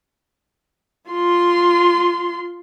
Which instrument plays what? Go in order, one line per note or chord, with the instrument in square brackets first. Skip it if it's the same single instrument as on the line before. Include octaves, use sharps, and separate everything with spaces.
[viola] F4 C6